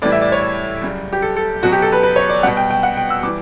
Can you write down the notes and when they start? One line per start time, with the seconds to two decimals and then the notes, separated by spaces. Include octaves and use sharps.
0.02 A2 E3 G3 D5
0.12 E5
0.21 D5
0.32 C#5
0.82 F#2 C#3 G3
1.13 G4
1.22 A4
1.37 A4
1.63 B2 F#3 F#4
1.72 G4
1.82 A4
1.92 B4
2.03 B4
2.16 C#5
2.29 D5
2.43 B2 G3 F#5
2.57 G5
2.71 G5
2.83 F#5
2.97 G5
3.10 E6
3.23 E3 G3 D6